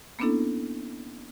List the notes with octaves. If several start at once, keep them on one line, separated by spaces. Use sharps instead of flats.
A#3 B3 C#4 D4 E4 A4